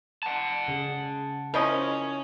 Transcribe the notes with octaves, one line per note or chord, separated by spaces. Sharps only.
F#5 A5
C#3 G#4
F3 C#4 E4 A#4 D#5